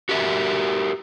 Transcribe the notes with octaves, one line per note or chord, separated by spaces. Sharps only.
F#4 G4 A#4 D#5 E5